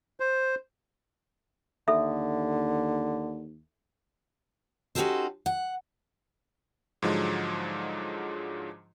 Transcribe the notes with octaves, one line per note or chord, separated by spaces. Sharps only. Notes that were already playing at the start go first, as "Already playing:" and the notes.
C5
D#2 D3 A4 E5
C#4 D#4 F#4 G4 A4 C5
F#5
G#2 D3 F3 F#3 G#3